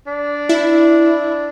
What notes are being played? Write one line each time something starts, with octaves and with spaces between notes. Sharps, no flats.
D4
E4